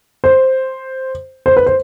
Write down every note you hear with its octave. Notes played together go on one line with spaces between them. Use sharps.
C5
C5
B4
C5